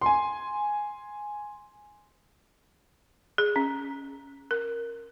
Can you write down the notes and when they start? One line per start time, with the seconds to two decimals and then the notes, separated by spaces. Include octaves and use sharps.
0.01 G#5 C6
3.38 G#4
3.56 C#4
4.51 A#4